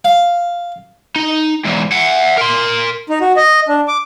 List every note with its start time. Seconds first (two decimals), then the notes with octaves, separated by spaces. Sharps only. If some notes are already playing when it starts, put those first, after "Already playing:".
0.05 F5
1.16 D#4
1.65 E2 G#2
1.92 E5 F#5
2.37 A#4 C6
3.08 D#4
3.21 F#4
3.37 D#5
3.69 D4
3.88 D6